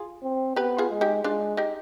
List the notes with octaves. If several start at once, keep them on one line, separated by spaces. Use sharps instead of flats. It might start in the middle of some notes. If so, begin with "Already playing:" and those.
Already playing: F4 G#4
C4
B3 G4 B4
F4 G#4
G#3
D#4 G4
G#3 D4 F4
D#4 G4